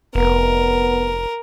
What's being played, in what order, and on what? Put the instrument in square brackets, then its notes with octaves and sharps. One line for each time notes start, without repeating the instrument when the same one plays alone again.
[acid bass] F1 [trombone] B3 [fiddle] A#4